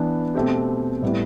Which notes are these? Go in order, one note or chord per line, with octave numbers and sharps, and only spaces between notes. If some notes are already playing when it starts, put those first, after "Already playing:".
Already playing: E3 B3 D4
B2 A3 C4 G4
A2 G3 B3 E4